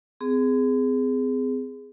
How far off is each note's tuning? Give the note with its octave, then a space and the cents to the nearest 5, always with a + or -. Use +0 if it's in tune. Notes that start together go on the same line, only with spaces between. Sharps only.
C4 -40 G#4 +0